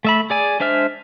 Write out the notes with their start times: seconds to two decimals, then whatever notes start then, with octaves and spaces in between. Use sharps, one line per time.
0.05 A3 E5 B5
0.30 G#4 D5 G#5
0.60 G#3 D4 C5 E5 F6